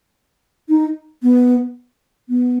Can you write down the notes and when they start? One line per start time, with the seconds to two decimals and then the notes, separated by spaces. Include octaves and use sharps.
0.69 D#4
1.23 B3
2.29 B3